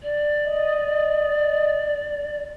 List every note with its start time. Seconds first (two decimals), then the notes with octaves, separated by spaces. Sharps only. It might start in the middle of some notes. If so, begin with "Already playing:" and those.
0.03 D5
0.45 D#5